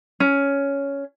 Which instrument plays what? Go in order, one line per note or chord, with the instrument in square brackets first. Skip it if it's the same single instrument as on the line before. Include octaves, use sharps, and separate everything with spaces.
[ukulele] C#4